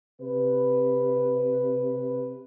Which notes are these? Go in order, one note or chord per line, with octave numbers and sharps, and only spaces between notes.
C3 B4